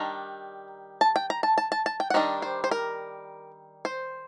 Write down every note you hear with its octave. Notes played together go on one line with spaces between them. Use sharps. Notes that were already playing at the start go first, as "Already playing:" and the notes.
Already playing: D#3 G3 D4 A#5
A5
G5
A#5
A5
A5
A5
A5
G5
F#5
D#3 G3 D4 D#5
C5
C5
A#4
C5